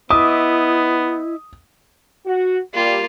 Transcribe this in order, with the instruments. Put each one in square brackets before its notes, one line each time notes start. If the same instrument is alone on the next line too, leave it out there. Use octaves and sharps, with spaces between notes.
[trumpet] B3 [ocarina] E4 [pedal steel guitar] D#5 E5 D6 [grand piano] D#6
[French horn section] F#4
[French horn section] G3 [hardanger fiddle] A#3 F4